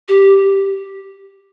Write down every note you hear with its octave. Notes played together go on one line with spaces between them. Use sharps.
G4